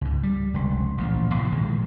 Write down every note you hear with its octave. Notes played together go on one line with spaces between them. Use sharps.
C#2 G#2
G3
F1 C#2
A1 A#2 F3
A2 C3 E3
A#1 D#3 G#3